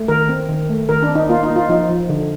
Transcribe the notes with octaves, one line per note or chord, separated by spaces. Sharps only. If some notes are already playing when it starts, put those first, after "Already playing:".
Already playing: A3
D#3 A#4
C4
D#3
A3
D#3 A#4
D4
C4
D#4
A#3 F4
D#4
A#3
F4
F3 D#4
F3
D3